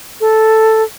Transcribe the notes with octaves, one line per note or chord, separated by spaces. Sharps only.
A4